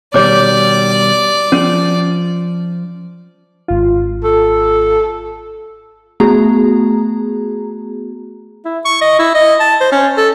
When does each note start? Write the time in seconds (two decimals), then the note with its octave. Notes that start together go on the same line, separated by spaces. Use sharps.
0.14 B2 D#3 G3 C#5 D5 D6
1.52 F3 C#4
3.68 G#1 F4
4.24 A4
6.20 A3 B3 F#4 G#4 A#5
8.65 E4
8.85 C#6
9.01 D#5
9.19 E4
9.35 D#5
9.60 A5
9.81 C5
9.92 C#4
10.17 A4